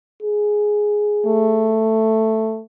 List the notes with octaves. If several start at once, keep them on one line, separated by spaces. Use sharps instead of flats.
G#4
A3